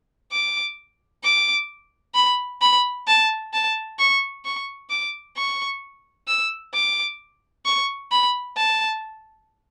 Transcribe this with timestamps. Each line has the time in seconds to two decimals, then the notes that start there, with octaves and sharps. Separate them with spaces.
0.32 D6
1.24 D6
2.15 B5
2.61 B5
3.07 A5
3.53 A5
3.99 C#6
4.45 C#6
4.90 D6
5.36 C#6
6.27 E6
6.74 D6
7.65 C#6
8.12 B5
8.57 A5